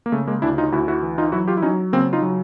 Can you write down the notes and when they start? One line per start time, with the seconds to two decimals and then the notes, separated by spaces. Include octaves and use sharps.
0.06 A#3
0.12 C#3 A3
0.27 G#3 A#3
0.42 D2 D4 E4
0.58 D#4 F4
0.72 D2 E4 F#4
0.88 E4 F#4
1.03 E3
1.18 D#4 F4
1.32 F#3 E4 F#4
1.48 F4 G4
1.57 E4
1.62 F#3 C#4 D#4
1.93 C#3 A#3 C4
2.13 D#4 F4
2.22 F#3